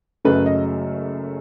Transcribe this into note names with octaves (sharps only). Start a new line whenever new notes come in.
F#1 F#2 C#3 F#3 A3 B4
D#5